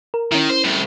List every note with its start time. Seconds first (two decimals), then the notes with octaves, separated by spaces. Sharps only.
0.14 A#4
0.32 D#3 C#4 E4
0.50 C5
0.64 C2 A2